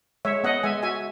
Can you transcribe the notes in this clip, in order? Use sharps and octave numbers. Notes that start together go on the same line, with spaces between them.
G#3 C#5 E5
B3 D#5 F#5
G#3 E5 G#5
F#4 E5 G#5